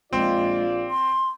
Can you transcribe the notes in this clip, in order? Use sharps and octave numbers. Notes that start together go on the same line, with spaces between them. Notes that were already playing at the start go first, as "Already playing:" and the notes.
A#1 G#3 C4 F4 D5
C6